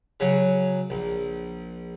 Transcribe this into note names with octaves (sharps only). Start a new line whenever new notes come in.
C#3 F#3
A#1